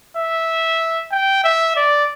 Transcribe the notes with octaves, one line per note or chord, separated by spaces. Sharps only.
E5
G5
E5
D5